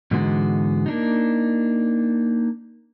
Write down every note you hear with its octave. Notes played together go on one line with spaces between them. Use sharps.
G#2 D3 E3 G#3 B3 F#4
A#3 D4 D#4